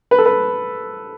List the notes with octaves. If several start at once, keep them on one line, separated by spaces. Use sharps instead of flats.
B4
A4
B4